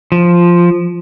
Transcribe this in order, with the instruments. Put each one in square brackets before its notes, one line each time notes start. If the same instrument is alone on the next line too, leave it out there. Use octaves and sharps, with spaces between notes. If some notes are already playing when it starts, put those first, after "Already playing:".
[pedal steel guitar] F3